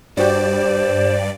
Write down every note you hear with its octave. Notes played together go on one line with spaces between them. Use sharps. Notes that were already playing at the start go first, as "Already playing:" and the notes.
G2 G3 F#4 G4 C5 D5